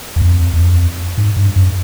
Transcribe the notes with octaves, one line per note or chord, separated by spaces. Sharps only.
E2
F2
E2
F2
G#2
G2
F#2